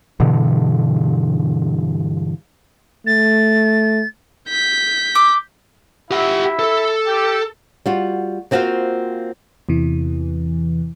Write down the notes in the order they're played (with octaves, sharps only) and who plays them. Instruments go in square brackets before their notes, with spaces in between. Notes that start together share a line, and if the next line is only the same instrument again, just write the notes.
[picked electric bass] G2 B2 D3 E3
[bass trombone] A3 [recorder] A6
[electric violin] G6 B6
[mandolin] D6 E6
[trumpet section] E4 E5 [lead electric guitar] G4 F#5
[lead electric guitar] A4
[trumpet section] G4
[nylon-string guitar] G3 F4 F#4
A#3 C4 F4 F#4 C5 F5
[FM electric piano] E2 C3 E3